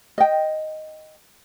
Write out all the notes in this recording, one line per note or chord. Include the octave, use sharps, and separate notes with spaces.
D#5 G5